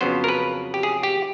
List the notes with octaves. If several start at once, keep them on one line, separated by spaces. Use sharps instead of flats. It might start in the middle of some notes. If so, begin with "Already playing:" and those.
F2 C#3 F#3 B3 C5
A#4
B4
G4
G#4
G4